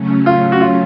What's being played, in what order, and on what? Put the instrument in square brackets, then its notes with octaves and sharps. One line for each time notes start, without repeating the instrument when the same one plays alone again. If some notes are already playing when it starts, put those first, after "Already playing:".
Already playing: [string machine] C#3 F#3 A3 C#4
[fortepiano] F4
F#4
F4